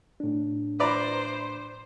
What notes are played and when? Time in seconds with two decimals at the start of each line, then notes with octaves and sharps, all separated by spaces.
0.20 A2 D4
0.80 B4 C5 D5 A#5